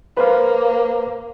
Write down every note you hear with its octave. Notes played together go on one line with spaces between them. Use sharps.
A#3 B4 C5 F5